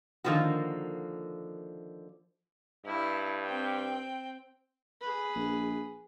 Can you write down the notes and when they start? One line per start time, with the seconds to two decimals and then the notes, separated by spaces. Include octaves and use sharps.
0.24 D3 D#3 F3 A#3 F#4
2.85 G2 E4
3.45 C4 G5
5.01 G#4 B4
5.35 A#1